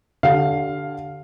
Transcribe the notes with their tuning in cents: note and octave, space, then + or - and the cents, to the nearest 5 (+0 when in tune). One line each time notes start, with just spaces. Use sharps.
D3 +0 G4 -25 F5 +0